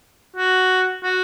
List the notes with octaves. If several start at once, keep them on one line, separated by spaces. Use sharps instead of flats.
F#4
F#4